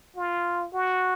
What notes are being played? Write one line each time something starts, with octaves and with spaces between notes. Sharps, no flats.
F4
F#4